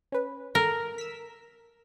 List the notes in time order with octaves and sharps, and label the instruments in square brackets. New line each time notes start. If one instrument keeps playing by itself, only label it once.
[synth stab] C#4 B4
[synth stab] G#1 A4 [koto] A#4
[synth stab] E6 B6